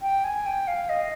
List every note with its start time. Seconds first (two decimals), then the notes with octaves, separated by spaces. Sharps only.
0.02 G5
0.24 G#5
0.46 G5
0.68 F5
0.89 D#5